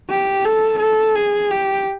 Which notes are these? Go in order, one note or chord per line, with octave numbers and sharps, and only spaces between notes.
G4
A4
A4
G#4
G4